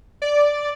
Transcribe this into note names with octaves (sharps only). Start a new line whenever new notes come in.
D5